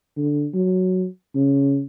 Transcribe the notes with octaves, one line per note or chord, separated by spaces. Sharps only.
D3
F#3
C#3